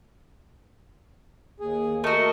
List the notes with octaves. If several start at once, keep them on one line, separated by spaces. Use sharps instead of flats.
D#2 G#4
A3 F#4 A#4 D#5